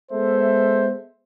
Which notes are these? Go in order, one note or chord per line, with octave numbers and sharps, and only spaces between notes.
G#3 B3 A4 C5 E5